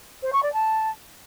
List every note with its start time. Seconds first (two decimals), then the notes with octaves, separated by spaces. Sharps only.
0.22 C5
0.32 C#6
0.42 D5
0.52 A5